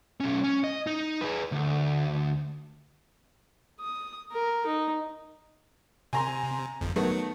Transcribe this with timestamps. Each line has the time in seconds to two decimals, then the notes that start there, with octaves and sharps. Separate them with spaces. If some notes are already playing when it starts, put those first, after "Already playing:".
0.20 B1 C#4
0.44 C#4
0.64 D#5
0.87 D#4
1.21 G#4 B4
1.52 D2
3.80 D#6
4.32 A#4
4.66 D#4
6.13 C3 G#5 A#5 C6
6.81 G1 F2
6.96 D#3 F#3 A3 B3